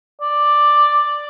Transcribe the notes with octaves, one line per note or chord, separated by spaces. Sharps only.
D5